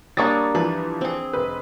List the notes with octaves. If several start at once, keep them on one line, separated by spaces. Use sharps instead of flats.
G3 A#3 D4 C#5 D#6 A6
E3 F3 B4
C4 G#4
F1 B4